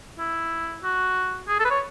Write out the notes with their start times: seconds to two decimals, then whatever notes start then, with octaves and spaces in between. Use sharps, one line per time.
0.19 E4
0.83 F#4
1.48 G#4
1.59 A4
1.65 B4
1.70 C#5